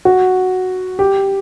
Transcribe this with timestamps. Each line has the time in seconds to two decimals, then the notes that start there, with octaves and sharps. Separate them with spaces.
0.05 F#4
0.99 G4